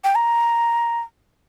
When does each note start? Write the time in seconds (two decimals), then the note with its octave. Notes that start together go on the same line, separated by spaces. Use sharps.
0.04 G5
0.15 A#5